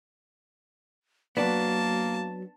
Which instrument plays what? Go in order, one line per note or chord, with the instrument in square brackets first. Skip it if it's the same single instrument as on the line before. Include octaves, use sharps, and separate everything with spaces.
[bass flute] F#3 [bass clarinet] A#3 [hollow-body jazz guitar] B3 D4 F#4 [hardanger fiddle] A5